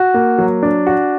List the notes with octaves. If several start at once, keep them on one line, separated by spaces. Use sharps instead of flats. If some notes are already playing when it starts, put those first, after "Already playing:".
Already playing: F#4
A#3
F#3
D4
F#4